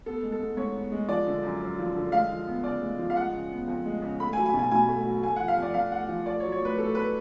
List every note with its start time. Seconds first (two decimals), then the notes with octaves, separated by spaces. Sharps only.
0.06 B3 A4
0.23 G#3
0.32 A4
0.40 G#2
0.57 G#2 C#5
0.74 B3
0.92 G#3
1.09 F3 D5
1.27 D3
1.43 F#2
1.62 F#2
1.79 F3
1.96 D3
2.12 G#3 F5
2.30 F3
2.47 B3
2.64 C#3 D5
2.81 G#3
2.99 F3
3.10 F5
3.16 G#3 F#5
3.33 C#3
3.51 B3
3.68 F2
3.85 G#3
4.02 C#3
4.20 A3 B5
4.33 G#5
4.37 F#3
4.46 G#5
4.54 B2
4.59 G#5
4.71 B2 G#5
4.89 A3
5.06 F#3
5.22 A3 G#5
5.36 F3 F#5
5.48 F5
5.57 F2
5.62 D5
5.74 F2 F5
5.91 A3 F#5
6.09 F3
6.26 A3 D5
6.40 C#5
6.44 F#3
6.52 C#5
6.61 A2 B4
6.77 A2 A4
6.95 A3 B4